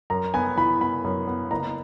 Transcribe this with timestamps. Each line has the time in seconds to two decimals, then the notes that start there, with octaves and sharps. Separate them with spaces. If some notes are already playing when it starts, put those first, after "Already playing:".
0.10 F#2 A#5
0.34 B3 G#5
0.57 E3 B5
0.81 B3 B5
1.04 F#2
1.27 B3
1.51 F#1 A#5